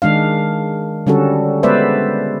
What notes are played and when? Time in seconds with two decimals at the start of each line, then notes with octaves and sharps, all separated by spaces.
0.02 D#3 G#3 D4 F5
1.07 D3 G3 C#4 F#4 A4
1.63 G#3 B3 B4 C5 D5 E5